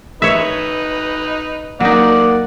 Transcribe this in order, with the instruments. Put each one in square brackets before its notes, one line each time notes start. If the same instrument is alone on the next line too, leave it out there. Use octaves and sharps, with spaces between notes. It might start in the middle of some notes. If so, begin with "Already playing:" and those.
[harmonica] D#4 B4 [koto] C#5 E5
[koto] F#3 D#4 [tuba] A#3 [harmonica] D5 F#5